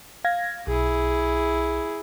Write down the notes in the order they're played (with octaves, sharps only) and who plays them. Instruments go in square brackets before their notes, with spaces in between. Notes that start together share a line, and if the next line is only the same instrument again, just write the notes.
[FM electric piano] F5 G#6 A#6
[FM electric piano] B1 [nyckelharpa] E4 G#4